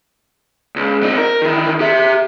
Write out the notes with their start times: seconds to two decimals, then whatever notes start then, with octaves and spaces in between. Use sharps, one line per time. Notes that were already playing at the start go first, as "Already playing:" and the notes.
0.76 C#2
1.03 C4 D#4
1.17 A#4
1.42 D#3 E3
1.80 G4 E5